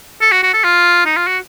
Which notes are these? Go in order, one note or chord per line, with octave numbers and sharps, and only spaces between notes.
A4
F#4
F#4
A4
F4
D#4
F4
F#4